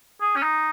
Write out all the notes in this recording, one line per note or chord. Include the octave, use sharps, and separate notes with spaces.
G#4
C#4
D#4